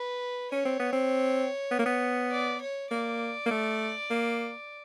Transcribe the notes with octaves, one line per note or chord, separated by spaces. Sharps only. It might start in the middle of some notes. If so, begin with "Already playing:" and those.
Already playing: B4
C#4 C#5
C4
B3
C4
B3
A#3
B3
D5
C#5
A#3 D5
A#3
A3
A#3